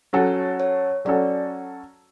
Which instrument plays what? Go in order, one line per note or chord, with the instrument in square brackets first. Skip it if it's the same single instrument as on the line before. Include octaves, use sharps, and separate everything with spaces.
[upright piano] F#3 C#4 F#4 A4 [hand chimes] C#5
[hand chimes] C#5
[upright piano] F#3 C#4 F#4 A4 [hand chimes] D5